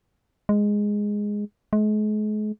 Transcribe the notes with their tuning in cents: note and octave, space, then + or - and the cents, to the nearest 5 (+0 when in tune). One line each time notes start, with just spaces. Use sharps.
G#3 -5
G#3 +40